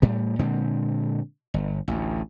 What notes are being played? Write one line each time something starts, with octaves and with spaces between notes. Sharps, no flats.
A2 G3
A#2 D3 G#3 C4
G1
A1 D2